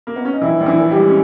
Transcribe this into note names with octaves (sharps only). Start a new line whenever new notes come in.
A#3
B3
C#4
D#4
A#1 E3 E4
A#1
E3 E4
A#2
G3 G4
G#3
C#4